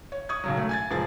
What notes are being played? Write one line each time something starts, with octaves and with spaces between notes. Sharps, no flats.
C#5
C#6 D#6 G#6
B1 C#3 F#3
A3
G#5 G#6 A6
F#1 F3 G#4 A6